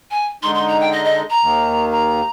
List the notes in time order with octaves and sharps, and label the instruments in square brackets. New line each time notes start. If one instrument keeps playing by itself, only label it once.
[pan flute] G#5
[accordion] D3 G#3 D#4 [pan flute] C6
[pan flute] C6
A#5
G5
D#5
D#5
A#5
[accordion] D#2 D#3 A#3
[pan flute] A#5